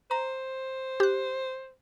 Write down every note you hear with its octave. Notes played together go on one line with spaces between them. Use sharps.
C5 A#5
G4 F#6